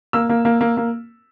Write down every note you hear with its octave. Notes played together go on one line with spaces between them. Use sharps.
A#3 E6
A#3
A#3
A#3
A#3